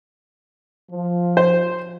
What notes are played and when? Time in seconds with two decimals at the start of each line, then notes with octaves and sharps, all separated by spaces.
0.91 F3
1.37 C5